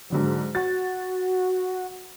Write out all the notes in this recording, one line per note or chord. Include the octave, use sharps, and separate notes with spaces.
G#2 D3 F#3
F#4 A6